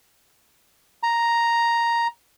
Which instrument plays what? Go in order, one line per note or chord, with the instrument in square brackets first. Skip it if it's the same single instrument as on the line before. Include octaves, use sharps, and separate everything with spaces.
[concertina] A#5